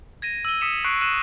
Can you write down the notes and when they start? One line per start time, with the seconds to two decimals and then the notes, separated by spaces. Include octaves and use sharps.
0.22 G#6 A#6 D#7
0.45 E6 D#7 G7
0.61 D#6 B6 C#7 D#7 E7
0.85 C#6 F#6 C7 D7
1.01 E6 F#6 D#7 E7